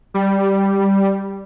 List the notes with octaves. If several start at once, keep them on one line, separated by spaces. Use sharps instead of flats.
G3